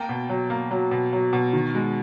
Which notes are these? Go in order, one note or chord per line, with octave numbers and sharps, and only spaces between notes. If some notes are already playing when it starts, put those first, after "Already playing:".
Already playing: A#3 G5 A5
B2
F#3
A#3
F#3
B2
F#3
B2
D#3
G#3